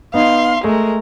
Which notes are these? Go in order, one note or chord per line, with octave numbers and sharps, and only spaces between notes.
B3 D#4 F5 C6
G#3 A3 A#4